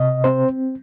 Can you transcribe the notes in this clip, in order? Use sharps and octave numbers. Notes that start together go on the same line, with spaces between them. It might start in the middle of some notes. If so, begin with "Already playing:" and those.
Already playing: C3 D#5
C4 C5